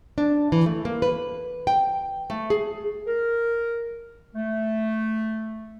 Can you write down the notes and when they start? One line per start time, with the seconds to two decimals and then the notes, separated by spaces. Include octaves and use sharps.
0.18 D4
0.52 E3
0.66 A3
0.85 A#3
1.02 B4
1.67 G5
2.30 A3
2.50 G#4
3.07 A#4
4.35 A3